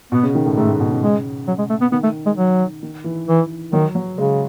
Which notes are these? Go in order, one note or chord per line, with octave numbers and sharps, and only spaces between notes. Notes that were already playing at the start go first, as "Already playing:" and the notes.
B2 B3
C#3
D#3
A2
G#2 A3
A2
B2
C#3
G#3
F#3
G#3
A3
B3
D#3 B3
A3
G#3
F#3
D#3
E3
E3
D#3 F#3
F#3
C#3 G#3